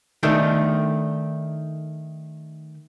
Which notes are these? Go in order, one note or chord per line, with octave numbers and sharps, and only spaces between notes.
D#3 A3 D4